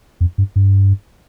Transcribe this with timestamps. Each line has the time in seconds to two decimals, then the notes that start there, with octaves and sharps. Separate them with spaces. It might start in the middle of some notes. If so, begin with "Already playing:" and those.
0.21 F2
0.38 G2
0.56 G2